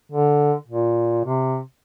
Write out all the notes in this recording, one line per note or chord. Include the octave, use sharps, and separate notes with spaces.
D3
A#2
C3